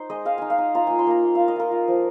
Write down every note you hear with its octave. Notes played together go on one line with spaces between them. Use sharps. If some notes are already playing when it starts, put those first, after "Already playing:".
Already playing: D#4 C5
G#3 D#5
G#3 F5
D#4 G#5
F5
D#4
F4 A#5
A#3 G#5
C6
A#3 A#5
A#3
F4 F5
D#5
F4 A#4
F4
F3